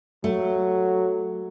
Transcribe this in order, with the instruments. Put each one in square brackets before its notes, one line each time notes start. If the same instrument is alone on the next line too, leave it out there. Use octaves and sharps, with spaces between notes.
[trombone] F#3 [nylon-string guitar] A3